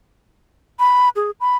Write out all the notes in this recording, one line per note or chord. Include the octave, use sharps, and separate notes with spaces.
B5
G#4
B5